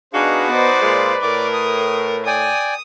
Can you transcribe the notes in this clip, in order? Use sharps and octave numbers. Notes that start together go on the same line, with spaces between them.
B2 D4 D#4 F#4 G#4 B4 F5
B3 C5 D5
A#2 G#3 F4
A2 A#4 D5 D6
D#6
D5 G5 G#5 D#6